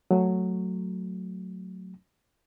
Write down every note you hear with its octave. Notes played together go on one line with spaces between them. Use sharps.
F#3 A3